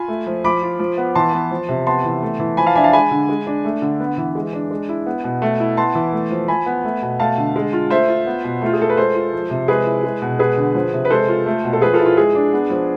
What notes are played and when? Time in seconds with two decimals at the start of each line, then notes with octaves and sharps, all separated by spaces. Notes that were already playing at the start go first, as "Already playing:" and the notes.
Already playing: F4 G#5 B5
0.08 A3
0.27 F3
0.44 F3 B5 D6
0.62 F4
0.79 F3
0.98 B3
1.15 E3 A5 C6
1.33 B3
1.51 F3
1.69 C3
1.87 B3 A5 C6
2.04 E3
2.22 A3
2.39 E3
2.57 F3 G#5 B5
2.66 F5 A5
2.75 D4 E5 G#5
2.84 F5 A5
2.93 G#3 G#5 B5
3.11 D3
3.29 G#3
3.47 D4
3.65 A3
3.82 D3
4.00 B3
4.17 E3
4.35 G#3
4.53 D4
4.71 G#3
4.89 E4
5.06 B3
5.24 B2
5.42 A3
5.60 E4
5.77 B3 A5 C6
5.95 E3
6.13 A3
6.31 F3
6.48 F3 G#5 B5
6.66 B3
6.84 A3
7.02 B2
7.20 A3 F5 A5
7.38 D3
7.56 G#3
7.73 F4
7.90 A3 C5 E5
8.09 F4
8.26 B3
8.44 B2
8.62 A3 F4
8.73 G#4
8.80 F4 A4
8.90 B4
8.97 G#3 A4 C5
9.15 F4
9.33 F3
9.50 C3
9.68 G#3 G#4 B4
9.86 E4
10.04 G#3
10.22 B2
10.39 G#3 G#4 B4
10.57 D3
10.75 F3
10.93 C3
11.05 B4
11.10 G#3 A4 C5
11.28 F4
11.46 A3
11.64 B2
11.73 A4
11.81 F3 G#4 B4
11.93 F4 A4
11.99 E4
12.06 F4
12.17 G#3 G#4
12.35 D4
12.53 B3
12.70 F3